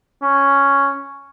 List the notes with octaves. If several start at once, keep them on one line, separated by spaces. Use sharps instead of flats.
C#4